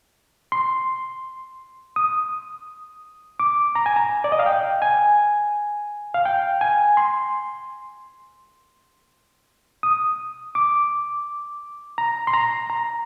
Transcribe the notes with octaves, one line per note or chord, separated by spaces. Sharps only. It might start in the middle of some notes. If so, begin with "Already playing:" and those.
C6
D#6
D6
A#5
G#5
A#5
D5
D#5
F5
G5
G#5
F5
G5
G#5
C6
D#6
D6
A#5
C6
A#5
A#5